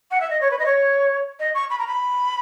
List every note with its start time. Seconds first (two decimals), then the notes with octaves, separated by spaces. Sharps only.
0.11 F#5
0.20 E5
0.30 D#5
0.41 C#5
0.50 B4
0.59 D#5
0.65 C#5
1.39 D#5
1.54 C#6
1.70 B5
1.79 A#5
1.87 B5